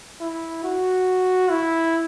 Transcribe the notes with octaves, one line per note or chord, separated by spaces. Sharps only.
E4
F#4
E4